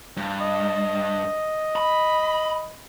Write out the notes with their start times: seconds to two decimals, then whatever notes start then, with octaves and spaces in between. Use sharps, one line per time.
0.17 G2
0.41 D#5
1.76 B5